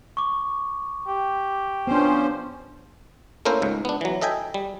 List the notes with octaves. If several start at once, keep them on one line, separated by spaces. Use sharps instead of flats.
C#6 D6
G4
F3 B3 C#4 D4 C5
A3 A#3 C#4 E4 A#4 C5
C#2 G#2
B3 D4
E3 F#3
A4 D#5 E5 G5 G#5
G3